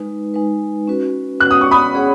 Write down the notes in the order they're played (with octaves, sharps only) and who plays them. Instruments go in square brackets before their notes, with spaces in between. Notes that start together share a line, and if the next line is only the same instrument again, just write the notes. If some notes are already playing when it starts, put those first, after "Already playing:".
Already playing: [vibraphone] G#3 D#4 B4
G#3 D#4 B4
C#4 F#4 B4
[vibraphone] C#4 F#4 B4 [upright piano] F#6
[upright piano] D#6
C#6
B5 D#6
[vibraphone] C#4 G#4 C#5 F#5